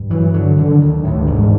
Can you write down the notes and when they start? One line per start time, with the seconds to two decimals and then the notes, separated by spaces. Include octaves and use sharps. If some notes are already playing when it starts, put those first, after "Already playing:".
Already playing: G2
0.10 E3 F#3
0.33 D3 F#3
0.57 D#3
0.81 D2
1.04 D2 A2
1.20 G2
1.27 E1 G#2